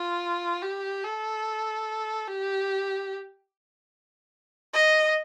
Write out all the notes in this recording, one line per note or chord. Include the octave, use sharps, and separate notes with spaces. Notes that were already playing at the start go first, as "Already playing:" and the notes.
Already playing: F4
G4
A4
G4
D#5